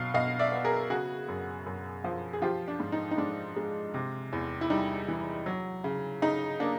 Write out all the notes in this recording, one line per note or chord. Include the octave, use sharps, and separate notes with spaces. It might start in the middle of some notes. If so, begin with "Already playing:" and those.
Already playing: B2 F#3 F5
B2 D#5 F5
D5 E5
B3
G#4 A#4
C#3 F#4 G#4
F#2
F#2
F3
G#4
F3 F4 G4
D4
G#2
D#4
D#4
G#2 D4
G#3
C3
E2
E4
G3 D#4
E3
F#3
C#3
C#3 D#4
A#3 D4